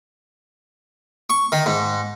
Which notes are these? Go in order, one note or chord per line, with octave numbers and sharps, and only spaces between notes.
C#6
D#3
G#2